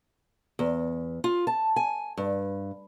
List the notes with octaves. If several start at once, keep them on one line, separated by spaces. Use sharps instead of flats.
E2
F4
A5
G#5
G2